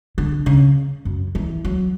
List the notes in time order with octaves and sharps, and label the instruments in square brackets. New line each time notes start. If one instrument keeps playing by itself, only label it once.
[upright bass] D3
C#3
F#2
E3
F#3